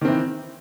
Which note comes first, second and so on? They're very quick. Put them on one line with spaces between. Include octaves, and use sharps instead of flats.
D#3 C4 E3